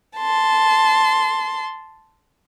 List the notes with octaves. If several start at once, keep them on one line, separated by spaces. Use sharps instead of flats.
A5 C6